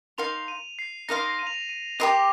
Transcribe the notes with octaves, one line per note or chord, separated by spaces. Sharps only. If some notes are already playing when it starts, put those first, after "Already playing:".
D#4 A#4 F5 C6 F7
D#7
C7
D#4 A#4 F5 C6 A#6
C7
A#6
D#7
F7
D#7
D#7
G4 A#4 D#5 C6 F7